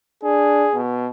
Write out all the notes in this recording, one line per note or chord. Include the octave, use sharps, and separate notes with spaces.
D4 G#4
B2